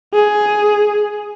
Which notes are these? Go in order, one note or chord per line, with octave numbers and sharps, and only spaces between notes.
G#4